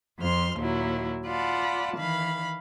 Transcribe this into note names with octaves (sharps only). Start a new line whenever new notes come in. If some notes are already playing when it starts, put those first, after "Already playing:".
F2 C5 C6 F6
D#2 A#2 F#3 E4
F4 D5 F#5 A5 B5
D#3 E3 F5 B5